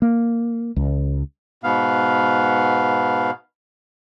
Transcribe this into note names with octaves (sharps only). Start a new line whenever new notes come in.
A#3
C#2
G#2 B2 B3 F5